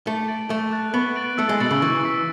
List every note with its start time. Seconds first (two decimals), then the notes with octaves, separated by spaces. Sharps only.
0.07 A3 D6
0.28 A6 D7 F#7
0.50 A3 C#6
0.72 F#6 A6
0.94 B3 C#6
1.16 F#6 A6 D7 F#7
1.38 A3 E6
1.49 G#3
1.60 B2 A6 C#7 F#7
1.71 C#3
1.82 E3 C#6
2.04 E6 B6